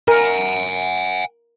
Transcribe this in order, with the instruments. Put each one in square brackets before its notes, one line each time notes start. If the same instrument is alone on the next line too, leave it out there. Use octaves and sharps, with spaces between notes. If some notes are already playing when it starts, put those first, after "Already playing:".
[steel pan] A#4 [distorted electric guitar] F#5 G#5